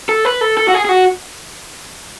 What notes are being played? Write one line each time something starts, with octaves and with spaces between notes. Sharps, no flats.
A4
B4
A4
A4
F#4
G#4
G#4
F#4